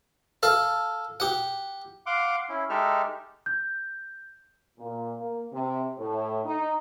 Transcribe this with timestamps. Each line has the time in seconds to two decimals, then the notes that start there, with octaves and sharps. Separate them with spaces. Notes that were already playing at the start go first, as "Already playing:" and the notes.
0.43 A4 F5 A5
1.20 G4 F#5
2.06 F5 F#5 C6 D6
2.49 C#4 E4
2.70 G#3 D#4 G4 A4 E5 F6
3.46 G6
4.77 A#2
5.17 A#3
5.52 C3
5.98 A2
6.44 D#4